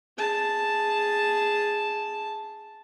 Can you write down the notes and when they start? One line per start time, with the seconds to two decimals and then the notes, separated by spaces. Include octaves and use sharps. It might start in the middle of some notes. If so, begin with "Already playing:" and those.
0.18 G#4 A5